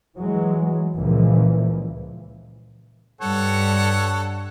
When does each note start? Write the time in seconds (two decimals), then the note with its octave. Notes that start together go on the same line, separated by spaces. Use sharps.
0.16 E3 F#3 G#3
0.95 C#2 A#2 E3 F3
3.21 G2 A4 C#5 F#5